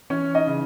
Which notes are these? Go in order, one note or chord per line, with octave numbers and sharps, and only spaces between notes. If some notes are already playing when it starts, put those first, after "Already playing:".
E3 C#4 C#5
D#4 D#5
C#3